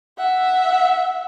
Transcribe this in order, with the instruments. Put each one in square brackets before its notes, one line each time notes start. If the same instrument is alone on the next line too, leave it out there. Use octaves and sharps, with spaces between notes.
[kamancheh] E5 F#5